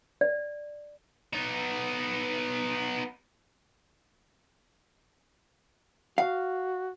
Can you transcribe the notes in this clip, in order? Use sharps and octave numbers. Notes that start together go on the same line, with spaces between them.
D5
B3 D#4
F#4 F5